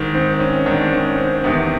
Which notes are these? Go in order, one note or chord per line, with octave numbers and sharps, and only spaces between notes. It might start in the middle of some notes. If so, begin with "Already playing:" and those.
Already playing: G#2 D#3
C4
C#4
G#2 D#3 D4
C#4
C4
E2 C3 D#3 B3